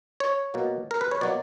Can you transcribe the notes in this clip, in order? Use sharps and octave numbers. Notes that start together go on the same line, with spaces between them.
C#5
B2 F#3 A#3
A#4
B4
C#5
B2 F#3 A#3 D5